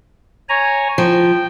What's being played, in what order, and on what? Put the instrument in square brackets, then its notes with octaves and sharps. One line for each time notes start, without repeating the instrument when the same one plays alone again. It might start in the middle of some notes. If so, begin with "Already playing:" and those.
[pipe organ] C#5 G#5 A#5
[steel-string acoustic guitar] F3 [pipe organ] G5